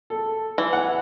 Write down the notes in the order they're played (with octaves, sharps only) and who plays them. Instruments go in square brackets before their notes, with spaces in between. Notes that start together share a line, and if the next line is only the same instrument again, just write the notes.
[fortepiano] A4
[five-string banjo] E3
[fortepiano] F#5